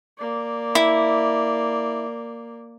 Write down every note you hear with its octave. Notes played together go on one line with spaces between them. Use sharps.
A#3 D5
E4